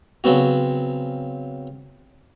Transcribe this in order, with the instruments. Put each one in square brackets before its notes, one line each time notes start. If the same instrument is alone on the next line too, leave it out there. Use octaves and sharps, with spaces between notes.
[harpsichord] C#3 F#3 B3 C4 F#4